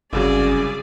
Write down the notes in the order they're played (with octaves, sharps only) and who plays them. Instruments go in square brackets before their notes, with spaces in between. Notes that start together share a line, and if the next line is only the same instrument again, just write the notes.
[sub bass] G1 [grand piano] C2 C#3 F#3 [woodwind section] C#4 [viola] G#4 D5